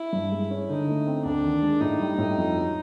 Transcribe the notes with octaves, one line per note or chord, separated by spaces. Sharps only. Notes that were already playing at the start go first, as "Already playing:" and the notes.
Already playing: E4
G2
G#3
C#4
D3 D#4
A3
C4
D2 D4
D#3
G#3
A2 D#4
G3
A2
F2
F#3